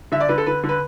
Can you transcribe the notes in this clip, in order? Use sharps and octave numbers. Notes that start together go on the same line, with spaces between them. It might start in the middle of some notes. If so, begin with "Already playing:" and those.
D3 E5
D5
D3 B4
A4
D3 B4
D3
B4